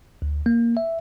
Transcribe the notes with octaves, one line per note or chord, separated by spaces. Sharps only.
D2
A#3
E5